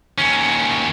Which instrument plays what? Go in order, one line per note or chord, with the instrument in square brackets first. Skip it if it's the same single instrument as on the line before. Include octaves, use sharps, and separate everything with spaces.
[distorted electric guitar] D#2 C#4